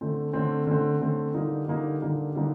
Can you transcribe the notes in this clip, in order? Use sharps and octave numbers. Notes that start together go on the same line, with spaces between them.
D3 A3 C4
D3 A3 C4
D3 A3 C4
D3 A3 C4
D3 G3 A#3 D#4
D3 G3 A#3 D#4
D3 G3 A#3 D#4
D3 G3 A#3 D#4